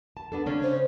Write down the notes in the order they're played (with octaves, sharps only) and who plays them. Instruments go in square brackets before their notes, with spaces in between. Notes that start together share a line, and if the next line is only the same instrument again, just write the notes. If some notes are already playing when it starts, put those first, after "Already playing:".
[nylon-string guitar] A5
B3 D4 A4
C#3 C#4 D4
[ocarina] C5